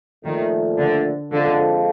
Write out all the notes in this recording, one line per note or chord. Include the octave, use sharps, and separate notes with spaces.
A#2 D#3 F3 A3
D3
D3 F3 G#3 C4 F4 A4